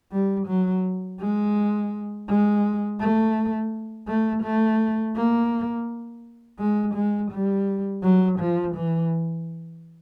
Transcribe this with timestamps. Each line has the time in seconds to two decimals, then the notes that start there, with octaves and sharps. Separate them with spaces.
0.12 G3
0.48 F#3
1.20 G#3
2.28 G#3
3.00 A3
4.07 A3
4.43 A3
5.16 A#3
6.59 G#3
6.95 G#3
7.32 G3
8.02 F#3
8.39 F3
8.75 E3